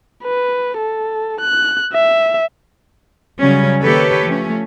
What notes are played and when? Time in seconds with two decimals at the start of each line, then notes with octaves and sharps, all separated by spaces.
0.24 B4
0.78 A4
1.41 F#6
1.93 E5
3.41 C#3 F#3 G3 C#4
3.83 D#3 A#3 G4 A4 B4 C#5
4.26 F3 A3 C#4